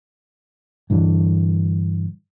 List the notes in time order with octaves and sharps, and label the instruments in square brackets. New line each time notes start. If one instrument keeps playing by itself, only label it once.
[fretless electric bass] G2 D3 E3